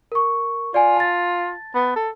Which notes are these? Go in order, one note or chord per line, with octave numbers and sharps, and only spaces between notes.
A#4 C#6
F4 D5 G#5
A5 A6
B3
A4